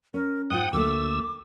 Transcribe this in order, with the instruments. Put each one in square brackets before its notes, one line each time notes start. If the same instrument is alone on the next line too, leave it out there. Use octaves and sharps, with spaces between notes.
[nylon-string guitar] C#4 [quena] A#4
[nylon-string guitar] G#2 F4 [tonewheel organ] F#5 D#6 [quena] G5
[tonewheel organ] D2 E6 [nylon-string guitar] A3 A#3 [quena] D6